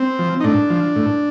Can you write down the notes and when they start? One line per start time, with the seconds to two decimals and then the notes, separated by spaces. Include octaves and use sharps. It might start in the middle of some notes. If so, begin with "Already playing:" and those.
Already playing: C4
0.19 F3
0.40 D#4
0.44 A2 D4
0.70 F3
0.96 A2